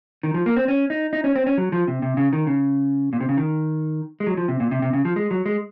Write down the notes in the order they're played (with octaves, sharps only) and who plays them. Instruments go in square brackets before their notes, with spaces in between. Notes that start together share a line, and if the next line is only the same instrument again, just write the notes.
[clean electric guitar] D#3
F3
A#3
C4
C#4
D#4
D#4
C#4
C4
C#4
F#3
F3
C3
C3
C#3
D#3
C#3
A#2
C3
C#3
D#3
G#3
F#3
F3
C3
A#2
C3
C3
C#3
F3
G#3
F#3
G#3